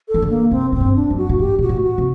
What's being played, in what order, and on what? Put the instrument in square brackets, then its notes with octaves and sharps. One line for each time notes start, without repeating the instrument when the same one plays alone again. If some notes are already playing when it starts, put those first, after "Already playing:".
[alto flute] A4
[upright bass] D#3
D3
[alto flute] A#3
[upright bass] C3 [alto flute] C4
[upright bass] A2 [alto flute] C4
[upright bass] G2
[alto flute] D4
[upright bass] F#2
[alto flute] F#4
[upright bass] A2
[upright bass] G2 [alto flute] G4
[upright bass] A#2 [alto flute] F#4
[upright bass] A2
[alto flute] F#4
[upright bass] C3